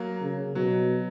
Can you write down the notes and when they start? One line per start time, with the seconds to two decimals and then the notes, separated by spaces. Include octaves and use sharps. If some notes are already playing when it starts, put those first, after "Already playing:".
Already playing: F#3 A#3
0.22 C#3
0.55 B2 F#3